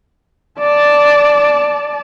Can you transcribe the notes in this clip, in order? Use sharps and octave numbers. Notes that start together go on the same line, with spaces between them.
D5 A5